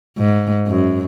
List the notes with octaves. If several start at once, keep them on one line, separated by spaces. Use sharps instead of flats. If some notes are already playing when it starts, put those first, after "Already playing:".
G#2
F#2